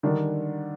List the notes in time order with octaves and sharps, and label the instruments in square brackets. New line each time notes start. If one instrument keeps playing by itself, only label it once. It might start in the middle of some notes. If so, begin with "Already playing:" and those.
[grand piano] D3 G3 D4 [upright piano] D#3